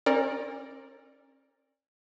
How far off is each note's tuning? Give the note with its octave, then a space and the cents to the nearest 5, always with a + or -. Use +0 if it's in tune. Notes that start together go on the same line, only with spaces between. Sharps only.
C#4 -40 A#4 +0 D5 +0